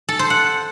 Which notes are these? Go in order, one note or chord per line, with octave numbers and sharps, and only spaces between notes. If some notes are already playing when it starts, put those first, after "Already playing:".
A4
C5
F#5